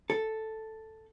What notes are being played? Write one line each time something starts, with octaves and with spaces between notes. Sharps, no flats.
A4